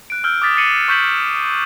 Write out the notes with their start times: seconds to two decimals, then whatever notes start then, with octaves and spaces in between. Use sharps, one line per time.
0.10 F#6 D7
0.24 E6 F6 G6
0.42 D6 D#6 A6 B6
0.56 D6 A6 C7 C#7 D#7 F#7
0.88 C#6 F#6 G6 B6 E7 F#7